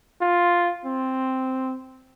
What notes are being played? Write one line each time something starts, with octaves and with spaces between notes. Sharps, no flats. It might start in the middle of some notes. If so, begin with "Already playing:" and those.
F4
C4